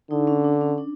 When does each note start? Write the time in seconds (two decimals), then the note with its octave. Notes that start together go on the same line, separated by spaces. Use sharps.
0.11 D3 D#4
0.27 C#4
0.44 D4
0.61 C#4
0.78 D4